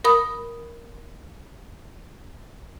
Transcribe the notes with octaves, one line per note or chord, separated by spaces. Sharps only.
A#4 B5 D#6